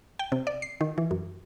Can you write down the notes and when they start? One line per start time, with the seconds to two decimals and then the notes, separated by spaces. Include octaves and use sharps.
0.19 G5
0.32 C3
0.47 D5
0.62 C7
0.81 D#3
0.98 E3
1.11 F#2